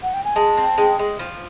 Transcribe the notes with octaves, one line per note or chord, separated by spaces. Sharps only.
F#5
G5
G#5
G#3 A5
C4
G#3
G#3
F3